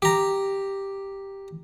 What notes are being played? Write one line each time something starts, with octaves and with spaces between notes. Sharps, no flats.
G4 A#5